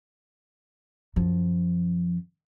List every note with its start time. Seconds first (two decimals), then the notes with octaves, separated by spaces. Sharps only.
1.16 F#2 F3